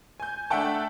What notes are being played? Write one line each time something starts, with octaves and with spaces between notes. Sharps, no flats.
G#5 G6
A3 D4 E5 F#5 G5 A5